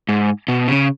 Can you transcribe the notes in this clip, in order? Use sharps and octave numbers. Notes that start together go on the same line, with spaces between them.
G#2
B2
C#3